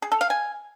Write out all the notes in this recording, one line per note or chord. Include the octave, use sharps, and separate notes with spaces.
G#4
A4
F5
G#5